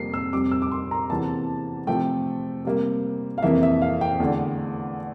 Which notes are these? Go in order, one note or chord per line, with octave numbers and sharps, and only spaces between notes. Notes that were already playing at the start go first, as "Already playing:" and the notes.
Already playing: F2 C3 G3 A#3 C7
E6
F2 C3 G3 D6
E6
D6
C6
A#5
E2 C3 E3 A#3 A5
C3 F3 A3 G5
C3 G3 A#3
F5
F2 C3 E3 A#3 E5
E5
F5
G5
E2 D3 A3